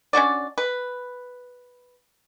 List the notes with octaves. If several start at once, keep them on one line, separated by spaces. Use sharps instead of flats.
C#4 D4 F#4 D5
B4